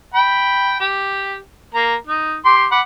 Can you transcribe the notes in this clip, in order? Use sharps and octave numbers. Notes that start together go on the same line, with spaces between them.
G5 B5
G4
A#3 A#5
D#4
G4 C6
F#5 B5 D6